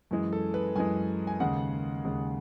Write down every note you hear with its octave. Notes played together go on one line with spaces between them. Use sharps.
F#2 E3 G#3
A4
B4
F#2 E3 G#3 G#5
G#5
D#2 C#3 G#3 F#5
D#2 C#3 G#3